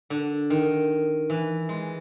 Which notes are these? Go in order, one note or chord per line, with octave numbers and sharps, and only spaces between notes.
D3
D#3
E3
G#3